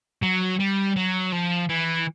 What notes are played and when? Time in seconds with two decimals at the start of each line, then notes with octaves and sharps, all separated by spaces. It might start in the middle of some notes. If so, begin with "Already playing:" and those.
0.23 F#3
0.60 G3
0.96 F#3
1.32 F3
1.69 E3